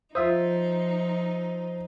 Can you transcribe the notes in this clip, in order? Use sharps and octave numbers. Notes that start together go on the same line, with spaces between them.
F3 D#4 F4 C5 E5 D#6